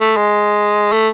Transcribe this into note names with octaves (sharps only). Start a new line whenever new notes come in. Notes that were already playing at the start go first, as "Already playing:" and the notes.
A3
G#3
A3